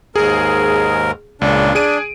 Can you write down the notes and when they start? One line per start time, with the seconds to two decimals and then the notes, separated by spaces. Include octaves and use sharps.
0.16 D#2 G#2 G#4 A#4
1.41 C#2 A#2 C#3 D4
1.75 D4 G#4 D7 D#7